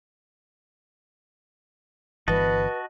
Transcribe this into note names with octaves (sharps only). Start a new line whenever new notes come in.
G1 E3 F#4 B4 D#5 A5